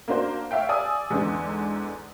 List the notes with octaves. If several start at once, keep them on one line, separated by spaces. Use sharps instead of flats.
A#3 D4 F#4 C5
C#5 E5 F5 G5
D5 G#5 D#6 E6
E2 G#2 D3